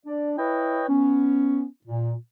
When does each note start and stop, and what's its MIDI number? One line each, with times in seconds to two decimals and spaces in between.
0.05 0.32 62
0.05 0.32 74
0.37 0.84 64
0.37 0.84 71
0.37 0.84 73
0.37 0.84 75
0.37 0.84 79
0.88 1.64 59
0.88 1.64 61
1.85 2.13 46